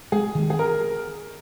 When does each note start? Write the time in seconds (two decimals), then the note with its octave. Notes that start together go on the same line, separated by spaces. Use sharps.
0.12 G#3 G#4
0.35 D#3
0.50 G#4
0.59 A#4